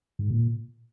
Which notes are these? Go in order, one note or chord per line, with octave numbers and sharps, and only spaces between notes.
G#2
A#2